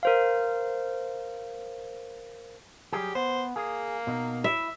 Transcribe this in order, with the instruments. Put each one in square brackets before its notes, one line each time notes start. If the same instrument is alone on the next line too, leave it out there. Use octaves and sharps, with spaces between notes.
[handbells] A#4 C5 F5
[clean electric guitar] F#3 G3 G#4 [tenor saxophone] G4
[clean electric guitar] B3 [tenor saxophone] C5
[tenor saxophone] A#3 [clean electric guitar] G#4
[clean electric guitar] B2 D#4
[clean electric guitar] E4 [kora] E5